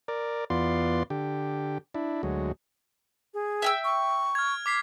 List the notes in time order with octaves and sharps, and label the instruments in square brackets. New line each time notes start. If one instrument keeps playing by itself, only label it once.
[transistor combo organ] A#4 D5
E2 B3 F4 D5 C6
D3 G4
D4 E4
D2 F#3 G#3
[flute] G#4
[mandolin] E5 G5 E6
[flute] C#6
[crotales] F6 G#6
D6 B6 C7